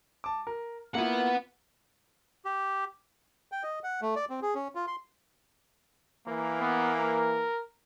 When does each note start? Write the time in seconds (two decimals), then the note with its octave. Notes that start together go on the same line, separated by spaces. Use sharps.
0.24 A5 D6
0.47 A#4
0.95 A#3 B3 E4 F4 F#5
2.45 G4
3.52 G5
3.63 D#5
3.84 F#5
4.02 A3
4.16 D5
4.30 C4
4.42 G#4
4.55 C#4
4.75 F4
4.87 C6
6.26 E3 A#3
6.60 B3
7.00 A#4